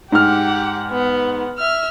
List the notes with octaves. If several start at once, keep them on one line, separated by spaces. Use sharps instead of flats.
G#2 G4 F#5 F6
B3
E5 F6